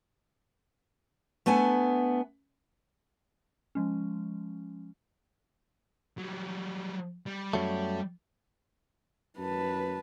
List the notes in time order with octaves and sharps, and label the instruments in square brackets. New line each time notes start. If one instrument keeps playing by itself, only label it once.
[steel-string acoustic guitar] A3 B3 D4 G#5
[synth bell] F3 G#3 C#4
[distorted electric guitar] F#3 G3
G3
[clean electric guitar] F#2 F#3 A3
[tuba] F#2 [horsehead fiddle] B4 A5